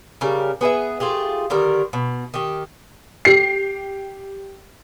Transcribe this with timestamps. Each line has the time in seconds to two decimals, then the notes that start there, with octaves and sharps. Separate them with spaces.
0.21 C#3 G3 A#4
0.61 B3 G#4 A#4 E5
1.00 A3 F4 G4 G#4
1.50 D3 D#3 G3 A#4
1.93 B2
2.34 D#3 G4
3.25 G4 C7